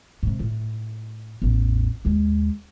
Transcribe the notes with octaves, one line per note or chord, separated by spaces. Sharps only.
G#2 C3
A2
A1 E2
D#2 G#3